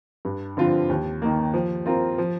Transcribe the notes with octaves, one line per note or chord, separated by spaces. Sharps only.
G2
D3 F3 C4 F4
D#2
D#3 A#3
F3
C4 F4 A#4
F3